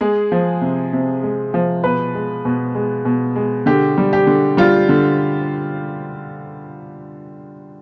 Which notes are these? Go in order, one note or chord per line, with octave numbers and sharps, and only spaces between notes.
G#3 G#4
F3
C3
C3
G#3
F3
B2 B4
G#3
B2
G#3
B2
G#3
D3 G4
G3
G4
D3
G3 F4
D3